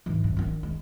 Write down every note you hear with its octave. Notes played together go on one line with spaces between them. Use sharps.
G#2 E3
G2
D#3 D4
G#3